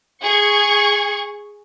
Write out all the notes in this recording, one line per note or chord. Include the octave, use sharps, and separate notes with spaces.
G#4 C#6 G#6